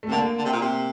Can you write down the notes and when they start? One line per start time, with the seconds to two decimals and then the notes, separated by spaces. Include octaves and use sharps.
0.03 A3
0.08 C3
0.12 D3 A#3
0.38 D3
0.45 C3
0.53 A#2
0.61 C3